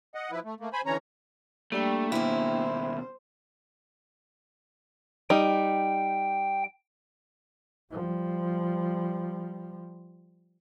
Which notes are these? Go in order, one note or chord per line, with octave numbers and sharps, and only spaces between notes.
D#5 F#5
F3 E4 B4
A3
A3 A#3
C5 G#5 B5
D3 E3 C#4 C#5 A#5
G3 A3 A#3 D4 G5
D#2 B2 C#4 E4 C5
G3 D#4 G5
F3 G3